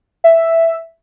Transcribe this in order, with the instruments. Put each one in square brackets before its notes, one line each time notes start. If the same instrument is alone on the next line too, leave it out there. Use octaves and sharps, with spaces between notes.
[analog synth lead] E5